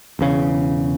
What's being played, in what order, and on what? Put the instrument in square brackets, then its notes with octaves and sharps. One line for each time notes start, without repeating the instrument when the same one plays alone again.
[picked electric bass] E1 E2 C#3